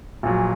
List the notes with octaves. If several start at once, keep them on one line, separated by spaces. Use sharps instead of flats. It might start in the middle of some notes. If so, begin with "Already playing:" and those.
A#1 A#2 F#3